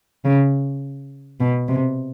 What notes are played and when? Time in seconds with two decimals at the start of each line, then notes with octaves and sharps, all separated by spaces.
0.25 C#3
1.40 B2
1.68 C3